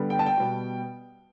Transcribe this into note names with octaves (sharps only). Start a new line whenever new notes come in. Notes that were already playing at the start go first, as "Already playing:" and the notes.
Already playing: D3 G3 B3
G5
A5
G5
B2 G3 B3